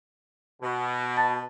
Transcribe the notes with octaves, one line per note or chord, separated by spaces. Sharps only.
B2
A5 A6